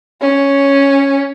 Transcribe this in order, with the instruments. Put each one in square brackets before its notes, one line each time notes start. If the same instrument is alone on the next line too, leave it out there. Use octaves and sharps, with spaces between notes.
[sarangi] C#4